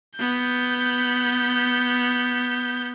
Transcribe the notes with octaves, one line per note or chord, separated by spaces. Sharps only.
B3 G6